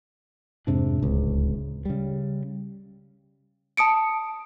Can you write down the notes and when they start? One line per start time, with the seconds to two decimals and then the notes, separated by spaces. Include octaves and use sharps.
0.67 F2 G#2 C3 D4
1.02 D1 C#2
1.85 C#3 G3
3.77 A5 D#6 C#7 D7